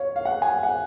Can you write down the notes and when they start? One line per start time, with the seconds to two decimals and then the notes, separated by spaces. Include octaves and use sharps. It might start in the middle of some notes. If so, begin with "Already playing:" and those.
Already playing: C#5 F5
0.16 F5
0.25 F#5
0.42 G#5
0.63 F#5